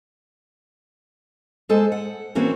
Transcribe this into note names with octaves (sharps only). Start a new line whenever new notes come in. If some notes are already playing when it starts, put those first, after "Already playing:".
G#3 A4 C5 G#5
F#5
E3 A#3 C4 C#4 F#4